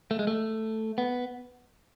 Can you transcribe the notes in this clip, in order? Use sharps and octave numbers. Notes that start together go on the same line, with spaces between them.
A3
G#3
A3
B3